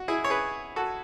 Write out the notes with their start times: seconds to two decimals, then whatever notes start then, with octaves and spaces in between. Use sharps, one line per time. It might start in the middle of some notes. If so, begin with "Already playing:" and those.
Already playing: F#4
0.08 E4 G#4
0.24 C#5
0.30 G#4 B4
0.76 F#4 A4